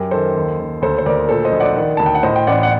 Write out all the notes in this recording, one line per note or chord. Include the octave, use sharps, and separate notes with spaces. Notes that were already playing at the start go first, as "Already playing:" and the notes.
Already playing: F#2 G4 A#4
D#3 A4 C5
D#2
D#2
D2 A4 C5
C5
D2 A#4 D5
A#2 A4 C5
C5 D#5
A#1
D5 F#5
D#3
D2 A5
G5
F#5
A2 C5 D#5
G5
A1 D5 F#5
F#5